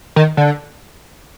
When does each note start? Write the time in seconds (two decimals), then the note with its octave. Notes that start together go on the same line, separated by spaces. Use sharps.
0.16 D#3
0.37 D3